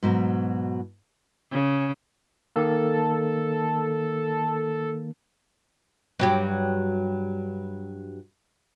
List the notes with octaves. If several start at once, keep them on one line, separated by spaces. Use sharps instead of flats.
G#2 B2 D3 F#3
C#3
D#3 A#3 A4
G2 F#3 G4